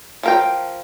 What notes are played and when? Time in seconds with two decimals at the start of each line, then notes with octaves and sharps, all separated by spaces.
0.23 F3 A#4 G5